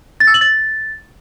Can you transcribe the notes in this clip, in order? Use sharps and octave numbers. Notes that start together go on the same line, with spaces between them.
A6
E6
F#7
A6